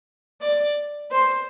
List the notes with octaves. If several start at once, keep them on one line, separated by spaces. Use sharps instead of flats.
D5
C5